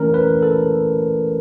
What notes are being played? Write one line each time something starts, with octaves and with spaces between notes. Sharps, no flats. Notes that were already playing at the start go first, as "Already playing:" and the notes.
Already playing: E3 A3 C#4 A#4
B4
A4